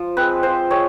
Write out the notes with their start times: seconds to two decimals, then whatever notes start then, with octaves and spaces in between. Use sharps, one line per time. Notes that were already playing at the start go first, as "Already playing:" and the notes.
Already playing: F3
0.17 G#3 C4 B4
0.43 F3 C5
0.70 G#3 C4 C#5